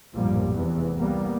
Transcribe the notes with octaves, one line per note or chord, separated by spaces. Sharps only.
A#1 F#2 A2 F3 G3 A#3
F1 E2 C3 E3 B3
C2 G3 A#3 B3